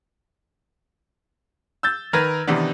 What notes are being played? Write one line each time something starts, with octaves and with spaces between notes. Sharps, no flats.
E6 G6 A6
D#3 A#4 B4 F6 G#6 A#6
C3 D#3 E3 B3 D4